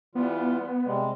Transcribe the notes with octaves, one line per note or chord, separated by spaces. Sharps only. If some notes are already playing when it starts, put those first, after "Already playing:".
E3 G3 B3 F4
C3 G3 G#3